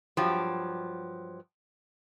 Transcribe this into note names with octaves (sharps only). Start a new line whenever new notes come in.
G2 F3 F#3 G4